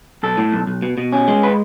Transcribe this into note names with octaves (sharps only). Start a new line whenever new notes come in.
B1 A4
A2
B1
B1
B2
B2
C#4
G#3
B4